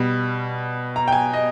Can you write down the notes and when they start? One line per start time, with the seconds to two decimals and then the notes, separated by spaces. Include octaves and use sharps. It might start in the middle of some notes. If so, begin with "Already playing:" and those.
Already playing: B2 G3
0.96 A#5
1.08 G5
1.12 G#5
1.33 D#5